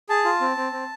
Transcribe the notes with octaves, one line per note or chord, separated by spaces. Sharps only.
G#4 A5
F4
C4
C4
C4